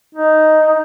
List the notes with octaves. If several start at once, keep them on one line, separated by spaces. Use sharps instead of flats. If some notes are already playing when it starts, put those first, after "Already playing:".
D#4